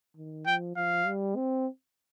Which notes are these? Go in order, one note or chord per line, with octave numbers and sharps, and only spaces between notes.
D#3
F3 G5
F3 F5
G3
C4